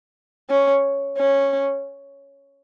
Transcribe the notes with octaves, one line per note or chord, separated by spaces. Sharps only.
C#4
C#4